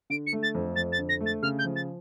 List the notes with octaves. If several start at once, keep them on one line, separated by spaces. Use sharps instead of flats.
D3 D7
C#7
A3
A6
F2
F2 A6
A6
D3
A#6
A3
A6
C#3 F6
G6
F3
A6